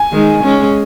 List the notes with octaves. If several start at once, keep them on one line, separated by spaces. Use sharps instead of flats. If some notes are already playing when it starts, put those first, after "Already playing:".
Already playing: G#5
D#3 G#3
G#3 C#4